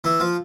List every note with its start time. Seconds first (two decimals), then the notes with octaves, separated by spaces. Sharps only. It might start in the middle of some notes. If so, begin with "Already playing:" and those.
0.04 E3 E4
0.20 F3 F4